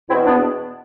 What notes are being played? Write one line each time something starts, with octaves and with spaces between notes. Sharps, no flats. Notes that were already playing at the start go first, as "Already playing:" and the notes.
E2 B2 C4 E4
B3 D4